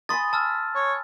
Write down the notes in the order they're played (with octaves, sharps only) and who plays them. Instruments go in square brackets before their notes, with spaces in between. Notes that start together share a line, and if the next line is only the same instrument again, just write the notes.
[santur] G#5 B5 D#6 [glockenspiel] C6 A6
[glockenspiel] A5 E6 F6
[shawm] C#5